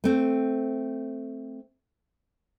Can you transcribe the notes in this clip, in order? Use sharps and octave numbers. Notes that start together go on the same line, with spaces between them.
A3 C4